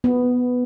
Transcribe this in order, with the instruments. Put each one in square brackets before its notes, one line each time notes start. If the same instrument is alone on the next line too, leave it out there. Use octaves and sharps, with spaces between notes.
[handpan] B3